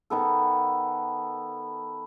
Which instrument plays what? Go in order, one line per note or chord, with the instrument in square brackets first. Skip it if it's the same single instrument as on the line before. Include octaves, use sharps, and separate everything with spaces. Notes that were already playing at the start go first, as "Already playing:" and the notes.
[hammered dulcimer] D#3 B3 A4